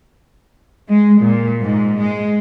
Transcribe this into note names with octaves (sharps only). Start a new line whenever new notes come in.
G#3
A#2
G#2
G#3